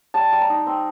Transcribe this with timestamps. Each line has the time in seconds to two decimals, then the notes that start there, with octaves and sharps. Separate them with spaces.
0.14 G3 A5
0.32 G3
0.41 A#5
0.50 D#4
0.67 C4